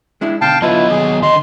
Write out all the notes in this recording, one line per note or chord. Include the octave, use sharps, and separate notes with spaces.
G#3 D4 E4
B2 D3 F5 G5 A5
D3 F#3 B3 E4 F4 B4 D#5
D#2 G#4
D3 D#5 C6